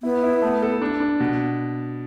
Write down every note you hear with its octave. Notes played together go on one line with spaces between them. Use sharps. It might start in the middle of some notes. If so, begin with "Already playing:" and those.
B3 E4
E4
A3
A4
D4
D4
B2